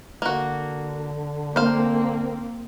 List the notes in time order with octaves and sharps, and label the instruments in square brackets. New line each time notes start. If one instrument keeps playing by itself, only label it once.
[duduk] D3 [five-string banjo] A#3 F#4
[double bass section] A#3 C4 [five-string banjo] C5 F5